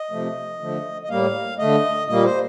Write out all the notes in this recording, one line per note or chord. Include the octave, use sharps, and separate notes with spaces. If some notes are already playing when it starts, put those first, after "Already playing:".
Already playing: D#5
C3 F3 A3
D3 F3 A3
D#5
A2 G3 A#3 F5
D3 A3 D#5
A#2 G3 A#3 D#5
C5